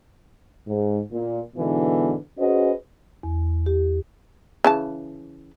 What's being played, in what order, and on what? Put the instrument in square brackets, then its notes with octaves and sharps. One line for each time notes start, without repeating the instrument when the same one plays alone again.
[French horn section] G#2
A#2
G#2 B2 D3 E3 B3
C#4 F#4 G#4 B4 C5 D#5
[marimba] E2
G4
[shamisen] C#3 E3 A5